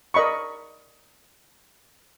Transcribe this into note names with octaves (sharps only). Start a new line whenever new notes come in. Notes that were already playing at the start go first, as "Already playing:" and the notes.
A#4 D5 D#5 B5 C#6